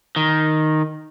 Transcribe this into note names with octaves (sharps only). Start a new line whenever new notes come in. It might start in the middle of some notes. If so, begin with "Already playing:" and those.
D#3